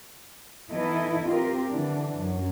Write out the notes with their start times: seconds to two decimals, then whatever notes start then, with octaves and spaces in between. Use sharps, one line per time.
0.71 E3 B3 D#4 E4 A4 D#5
1.29 C4 F4 G4 A#4
1.69 D3 E3 D4
2.17 F#2